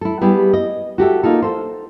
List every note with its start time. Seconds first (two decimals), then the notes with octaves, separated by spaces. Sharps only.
0.01 E4 A4
0.21 G3 B3 E4 G4 G#4
0.53 D#5
0.98 F#4 G4 A4 E5
1.23 A#3 D#4 F4 A4
1.42 A4 C5